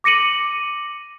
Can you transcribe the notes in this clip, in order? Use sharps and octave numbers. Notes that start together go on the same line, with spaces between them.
D6 A#6 C#7 D#7 F#7